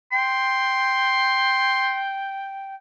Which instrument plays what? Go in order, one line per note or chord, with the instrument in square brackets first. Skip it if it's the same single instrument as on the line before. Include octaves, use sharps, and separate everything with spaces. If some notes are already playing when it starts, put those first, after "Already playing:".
[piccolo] G5 [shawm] C6